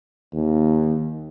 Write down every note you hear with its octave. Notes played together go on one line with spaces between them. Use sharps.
D#2